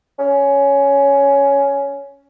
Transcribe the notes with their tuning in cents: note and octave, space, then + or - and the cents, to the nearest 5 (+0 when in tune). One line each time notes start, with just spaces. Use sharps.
C#4 +10